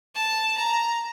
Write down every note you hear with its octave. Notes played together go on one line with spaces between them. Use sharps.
A5
A#5